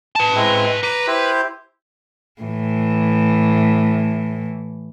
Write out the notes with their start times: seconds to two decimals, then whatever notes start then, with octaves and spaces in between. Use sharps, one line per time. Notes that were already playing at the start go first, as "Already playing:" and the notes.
0.15 B4 A5
0.36 G#3 C4 E4
0.83 B4 A#5 D6
1.07 E4 G4 C5
2.42 A2 E3